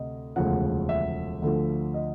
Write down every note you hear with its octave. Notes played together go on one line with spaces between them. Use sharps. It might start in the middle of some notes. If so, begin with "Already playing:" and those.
Already playing: D2 C3 D#5
E1 D2 C#3 F3 F#5
E5
D2 D3 F3
D#5